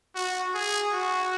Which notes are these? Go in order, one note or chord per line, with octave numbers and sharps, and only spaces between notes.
F#4
G#4
F#4